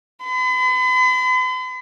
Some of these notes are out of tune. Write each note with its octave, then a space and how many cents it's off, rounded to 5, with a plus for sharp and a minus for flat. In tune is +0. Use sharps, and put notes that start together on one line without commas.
B5 +45